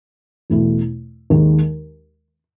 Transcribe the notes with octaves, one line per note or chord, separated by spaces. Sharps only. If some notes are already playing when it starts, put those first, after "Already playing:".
E2 B2 A3 E4
D#2 D#3 G#3